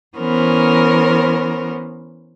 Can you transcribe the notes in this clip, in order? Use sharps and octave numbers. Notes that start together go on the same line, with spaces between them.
E3 B3 C#4 A#4 C5